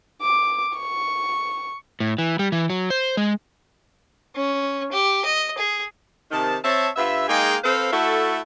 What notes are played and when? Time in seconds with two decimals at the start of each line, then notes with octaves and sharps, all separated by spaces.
0.22 D6
0.77 C#6
2.00 A2
2.18 E3
2.39 G3
2.52 E3
2.70 F#3
2.90 C5
3.17 G#3
4.36 C#4
4.92 G4
5.25 D#5
5.58 G#4
6.31 C3 D#3 A5
6.64 C4 C#5 E5 A5
6.96 G2 F4 B4 E5
7.28 G#3 A#3 D#4 G#4 F5 G5
7.64 C4 A4 B4 C5 F5
7.93 A3 E4 F#4 A4